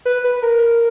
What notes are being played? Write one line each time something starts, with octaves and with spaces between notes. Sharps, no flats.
B4
B4
A#4